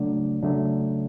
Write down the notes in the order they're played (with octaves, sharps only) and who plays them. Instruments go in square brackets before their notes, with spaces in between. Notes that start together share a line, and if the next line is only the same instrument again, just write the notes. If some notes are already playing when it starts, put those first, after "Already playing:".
Already playing: [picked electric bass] C#3 F#3 A3 D4
C#3 F#3 A3 D4